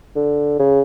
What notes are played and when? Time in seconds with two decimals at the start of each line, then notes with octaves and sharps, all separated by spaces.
0.16 D3
0.59 C#3